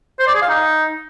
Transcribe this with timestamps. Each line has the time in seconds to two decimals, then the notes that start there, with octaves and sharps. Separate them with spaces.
0.19 C5
0.27 D5
0.34 G#4
0.42 F5
0.49 D#4